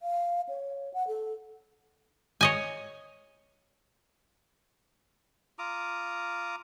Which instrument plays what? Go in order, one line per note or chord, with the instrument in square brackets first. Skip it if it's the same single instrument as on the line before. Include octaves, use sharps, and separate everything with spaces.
[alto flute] F5
C#5
F#5
A4
[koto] C#5 D#5 G#5
[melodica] F4 A#5 D6 D#6